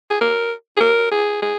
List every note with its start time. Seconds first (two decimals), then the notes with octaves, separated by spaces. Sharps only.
0.10 G#4
0.21 A#4
0.77 G#4
0.81 A#4
1.12 G#4
1.42 G#4